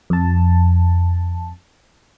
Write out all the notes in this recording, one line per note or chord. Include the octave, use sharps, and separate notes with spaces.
F2 A5